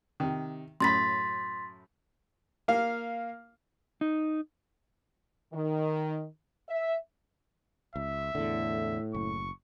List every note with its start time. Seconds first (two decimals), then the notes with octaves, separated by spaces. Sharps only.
0.20 C3 D#3
0.80 F#2 A2 B5 C6 A6 B6
2.68 A#3 F5
4.01 D#4
5.53 D#3
6.69 E5
7.96 C#2 E5
8.35 E2 A2 D3
9.14 F#1 C#6